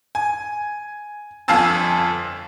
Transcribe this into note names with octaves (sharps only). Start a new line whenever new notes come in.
G#5
G1 F2 F5 G#5 A5 E6